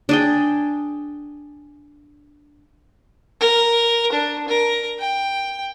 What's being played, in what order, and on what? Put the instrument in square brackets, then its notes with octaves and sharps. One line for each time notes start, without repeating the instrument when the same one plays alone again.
[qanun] D4 G#4 G5
[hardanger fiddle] A#4
D4
A#4
G5